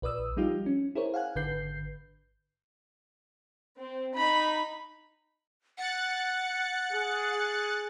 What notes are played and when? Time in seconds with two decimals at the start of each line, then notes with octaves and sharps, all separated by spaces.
0.02 A#1 B4 D5 D#6 E6
0.37 F3 G3 D#4 F4 G4
0.66 C#4
0.95 E4 G#4 A#4 C5 C#5
1.14 F5 F#5 G#5 F#6
1.36 G#1 D3 B4 G6 C7
3.77 C4
4.13 D#4 B5
5.78 F#5 F#6 A6 C#7
6.93 G#4